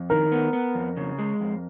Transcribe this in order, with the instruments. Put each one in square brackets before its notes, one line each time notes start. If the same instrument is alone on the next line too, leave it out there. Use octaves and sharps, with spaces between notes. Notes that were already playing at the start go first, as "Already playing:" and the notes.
Already playing: [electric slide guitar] F2
[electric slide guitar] D#3 [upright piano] A#4
[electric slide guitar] B3
B3
F2
C#3
G#3
F2